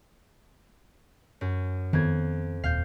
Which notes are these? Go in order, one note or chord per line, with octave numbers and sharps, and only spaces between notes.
F#2
F2 D#3 B3 G#6
D#1 F5 G6